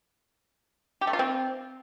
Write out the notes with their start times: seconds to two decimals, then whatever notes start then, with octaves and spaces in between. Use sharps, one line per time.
1.01 G4
1.07 A3
1.13 F4
1.19 C4